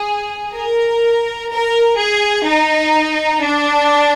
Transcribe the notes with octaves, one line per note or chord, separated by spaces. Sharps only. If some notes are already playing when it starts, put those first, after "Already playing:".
Already playing: G#4
A#4
A#4
G#4
D#4
D4